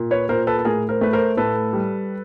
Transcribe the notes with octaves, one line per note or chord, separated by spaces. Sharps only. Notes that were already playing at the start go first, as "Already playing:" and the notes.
Already playing: A#2
B4 C#5
A#2 A#4 C5
A4 B4
A4
A2 G#4 A#4
A#4 C5
A3 B4
A#4 C5
A2 A4 B4
G3